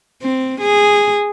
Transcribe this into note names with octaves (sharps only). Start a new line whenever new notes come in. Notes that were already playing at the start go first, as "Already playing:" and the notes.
C4
G#4